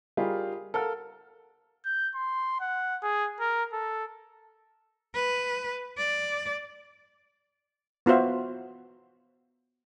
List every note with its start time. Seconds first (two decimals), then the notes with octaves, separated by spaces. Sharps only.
0.17 G3 F4 G4 G#4 A#4 D#5
0.74 A4 A#4 F5 F#5 F6
1.85 G6
2.15 C6
2.61 F#5
3.03 G#4
3.40 A#4
3.73 A4
5.15 B4
5.98 D5
8.06 B3 F4 F#4 C5 E5